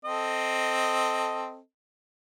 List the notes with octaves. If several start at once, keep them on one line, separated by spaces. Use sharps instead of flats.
C4 A4 D#5